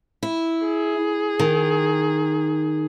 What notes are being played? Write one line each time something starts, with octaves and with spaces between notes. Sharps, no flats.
E4
G#4
D#3